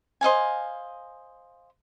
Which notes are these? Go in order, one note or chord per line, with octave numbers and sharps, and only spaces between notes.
C5 D#5 F5 G#5